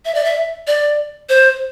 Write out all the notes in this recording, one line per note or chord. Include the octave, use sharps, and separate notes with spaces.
E5
D5
E5
D5
C5